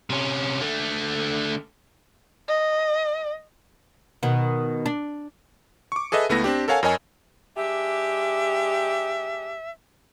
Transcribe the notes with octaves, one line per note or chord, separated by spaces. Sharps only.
C3 C#4
D3 A3
D#5
B2 D#3
D4
C#6 D6
G#4 A4 B4 D#5 E5
C#2 A3 B3 E4 A#6
C4 D4 G4
A4 A#4 C#5 F5 F#5 G#5
F2 A#4 C#5 D#5 G#5
G#3 D4 G4 E5